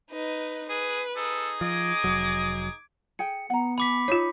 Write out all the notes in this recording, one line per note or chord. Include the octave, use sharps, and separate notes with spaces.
D#4 B4
G#4 B4
D#4 G#4 A4 D#6
F3 D#5 D6 G#6
F1 F#3
G#4 G5 C#7
B3 F#5 A#5
G#5 B5 D6 B6
D#4 F4 C#5